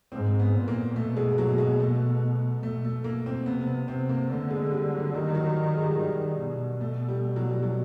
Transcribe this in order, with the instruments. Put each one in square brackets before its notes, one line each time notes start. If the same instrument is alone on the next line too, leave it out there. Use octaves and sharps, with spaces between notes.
[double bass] G#2 [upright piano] C4
[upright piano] B3
[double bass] A#2
[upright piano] A#3
[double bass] B2 [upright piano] A3
[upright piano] G#3
F#3
G#3
A3
[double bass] B2 [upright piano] A3
[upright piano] A3
A#3
C4
[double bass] C3 [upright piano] B3
[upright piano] B3
[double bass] C3 [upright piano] C4
[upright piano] A#3
[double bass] D3 [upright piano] A3
[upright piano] G#3
G3
F#3
[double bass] D#3 [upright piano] G3
[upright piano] F#3
F#3
G#3
G3
F#3
[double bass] D#3 [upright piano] G3
[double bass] B2
[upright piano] A3
G3
F#3
G3
F#3